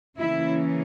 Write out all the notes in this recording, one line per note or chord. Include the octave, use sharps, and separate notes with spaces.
C#3 E3 A#3 C#4 E4